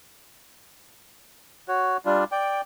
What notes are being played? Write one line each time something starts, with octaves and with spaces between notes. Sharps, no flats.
F#4 C#5
G3 D4 F4
D5 G5